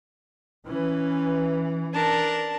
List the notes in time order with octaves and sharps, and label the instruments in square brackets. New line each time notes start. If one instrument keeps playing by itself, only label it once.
[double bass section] E3 [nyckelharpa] C#4 B4
[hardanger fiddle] D4 A#4 [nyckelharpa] A5